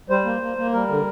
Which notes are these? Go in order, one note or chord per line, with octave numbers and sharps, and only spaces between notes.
G3 C5
A#3
A#3
A#3
G3 A#4
D3